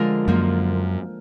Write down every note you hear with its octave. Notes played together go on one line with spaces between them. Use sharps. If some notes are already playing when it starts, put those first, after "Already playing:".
Already playing: D3 F3 G#3 D4 F4 A#4
F#2 F3 A#3 F4